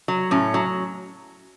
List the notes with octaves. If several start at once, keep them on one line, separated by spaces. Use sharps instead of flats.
F#3
A2 C#4
F#3